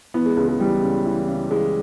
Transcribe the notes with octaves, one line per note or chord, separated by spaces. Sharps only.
E3 B3
G#3
C#2 G#3
G#3
E3 G3
C#3
E3
C#3
E3 G#3